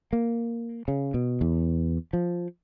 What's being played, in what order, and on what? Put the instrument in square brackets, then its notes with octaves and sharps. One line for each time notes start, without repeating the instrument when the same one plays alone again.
[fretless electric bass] A#3
C#3
B2
E2
F3